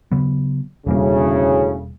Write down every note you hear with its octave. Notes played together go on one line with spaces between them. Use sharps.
C#3 F#3 B3
E1 D2 A2 C#3 G3 A#3